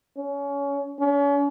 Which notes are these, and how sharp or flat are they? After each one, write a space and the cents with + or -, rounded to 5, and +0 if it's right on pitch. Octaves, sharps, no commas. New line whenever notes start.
C#4 +25
C#4 +40